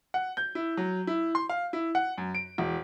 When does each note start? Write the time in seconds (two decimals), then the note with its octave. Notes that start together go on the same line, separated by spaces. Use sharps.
0.14 F#5
0.37 G6
0.55 E4
0.77 F#3
1.07 E4
1.35 C6
1.49 F5
1.73 E4
1.95 F#5
2.18 F#2
2.35 D7
2.58 E1